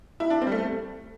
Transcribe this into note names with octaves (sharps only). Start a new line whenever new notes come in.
E4
D4
C4
G3
A3